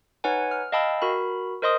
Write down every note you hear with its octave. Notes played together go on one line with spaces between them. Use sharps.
D#4 B4 C#5 F#5 G#5
F6
D#5 F5 G5 A5 B5 E6
F#4 A#4 B5
A#4 C5 D#5 C6 D#6